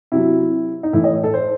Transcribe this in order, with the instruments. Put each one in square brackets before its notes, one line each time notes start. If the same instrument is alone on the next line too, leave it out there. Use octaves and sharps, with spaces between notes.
[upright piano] C3 F#3 E4
D#4
A2 E3 E4
D#5
C#5
A4
C5